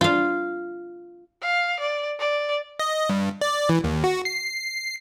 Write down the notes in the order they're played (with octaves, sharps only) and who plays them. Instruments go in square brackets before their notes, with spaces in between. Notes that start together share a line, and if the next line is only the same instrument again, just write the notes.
[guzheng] F4 F5
[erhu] F5
D5
D5
[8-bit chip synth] D#5
G2
D5
E3
D#2
F#4
C7